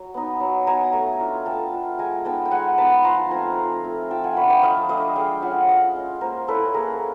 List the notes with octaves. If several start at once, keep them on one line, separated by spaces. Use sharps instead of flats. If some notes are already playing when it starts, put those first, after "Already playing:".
Already playing: F#3
B3 D#4
F#3
B3 D#4 G#5 A#5
A3
D4 F4
A3 G5 A5
D4 F4
G#3 G#5 A#5
B3 D#4 G5 A5
G5
G#3 F#5 G#5
B3 D#4 A5 B5
F3 A#5 C6
A3 C4 F4 G#5 A#5
F3
A3 C4 F4
F3 G5 A5
F#5 G#5
A3 D4 B5 C#6
G5 A5
F3 D#5 F5
A3 D4 D#5 F5
G#3 F5 G5
C#4 F4 E5 F#5
G#3 D#5 F5
C#4 F4
A#3 A#4 C5
C#4 E4 A4 B4
A#3 G#4 A#4